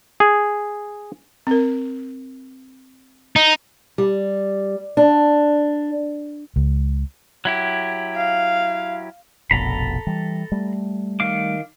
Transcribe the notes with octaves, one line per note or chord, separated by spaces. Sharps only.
G#4
C4 A#4
D#4
G3
D4
C#2
F#3 E4 G4
F5
F1 A#1 B2 A4 A#5 B5
E3 G3
G3 A3
D#3 F5 D6